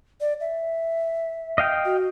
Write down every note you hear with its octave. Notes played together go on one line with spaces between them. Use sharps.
D5
E5
D#5 F5 G5
F#4